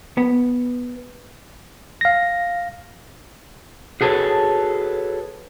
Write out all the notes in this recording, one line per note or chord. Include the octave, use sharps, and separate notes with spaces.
B3
F5 A#6
F#4 G#4 A4 B4 C#5